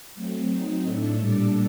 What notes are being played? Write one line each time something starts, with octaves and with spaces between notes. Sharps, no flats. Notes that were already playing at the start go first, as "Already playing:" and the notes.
F#3 A3 C4
F#3 C4 D#4
A2 A3 D4 A4
A#2 G3 D4 A4 D5